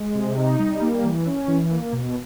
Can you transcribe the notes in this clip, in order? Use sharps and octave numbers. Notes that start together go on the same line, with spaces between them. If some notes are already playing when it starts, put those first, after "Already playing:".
Already playing: G#3
C3
D#4
G3
A#3
E3
C#4
E3
A#3
B2